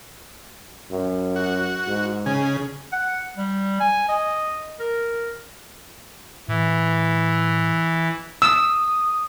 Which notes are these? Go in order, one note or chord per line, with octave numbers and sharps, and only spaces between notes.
F#2
F#4
G#2
C#3 G#4
F#5
G3
G#5
D#5
A#4
A2 E3
D#6 E6